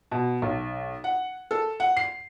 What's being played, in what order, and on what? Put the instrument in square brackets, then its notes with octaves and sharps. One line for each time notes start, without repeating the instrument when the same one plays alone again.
[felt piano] B2
B1
F#5
A4
F#5
C7